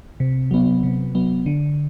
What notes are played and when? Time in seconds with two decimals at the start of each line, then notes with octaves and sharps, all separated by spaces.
0.20 C3
0.51 F#3 B3
0.83 C3
1.15 F#3 B3
1.46 D3